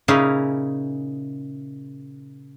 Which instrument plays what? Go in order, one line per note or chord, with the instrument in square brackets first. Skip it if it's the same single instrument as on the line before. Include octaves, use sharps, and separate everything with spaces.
[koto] A#2 C#3 C#4 D#4 E4 G#4